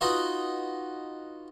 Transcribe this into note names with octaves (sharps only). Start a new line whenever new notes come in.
D#4 F4 F#4 B4 D#5